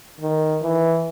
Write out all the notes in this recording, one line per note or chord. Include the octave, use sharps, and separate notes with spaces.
D#3
E3